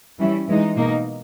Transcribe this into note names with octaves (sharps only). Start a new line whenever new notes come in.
E3 G3 C#4 E4
E3 G#3 D#4
B2 A#3 D#4